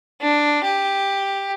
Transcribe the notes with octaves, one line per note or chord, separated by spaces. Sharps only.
D4
G4